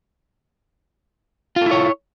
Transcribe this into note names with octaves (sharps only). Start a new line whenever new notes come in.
E4 F4 A4 C#5